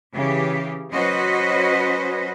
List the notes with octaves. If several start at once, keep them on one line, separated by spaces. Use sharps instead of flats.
C#3 E3 G4
F#3 C#4 F#4 B4 C5 D#5